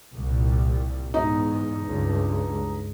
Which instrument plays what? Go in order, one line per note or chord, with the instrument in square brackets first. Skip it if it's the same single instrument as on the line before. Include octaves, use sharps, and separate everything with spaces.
[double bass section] C2 A#2 G3
[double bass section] E2 G#2 [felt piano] D#4
[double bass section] C#2 G2